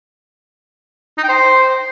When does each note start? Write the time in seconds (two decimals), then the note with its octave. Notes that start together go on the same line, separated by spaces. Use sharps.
1.18 D#4
1.23 G5
1.29 C5